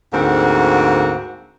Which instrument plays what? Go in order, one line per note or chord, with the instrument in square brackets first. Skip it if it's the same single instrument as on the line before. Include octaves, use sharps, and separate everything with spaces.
[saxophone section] D2 G#2 A#3 C4 F#4